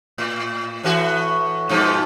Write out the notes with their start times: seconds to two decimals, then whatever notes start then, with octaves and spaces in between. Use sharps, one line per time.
0.18 A2
0.83 A2 E3 F#4
1.69 G2 B2 F3